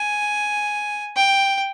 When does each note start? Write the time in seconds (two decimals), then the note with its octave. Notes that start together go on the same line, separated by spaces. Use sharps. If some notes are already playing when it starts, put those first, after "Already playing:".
Already playing: G#5
1.16 G5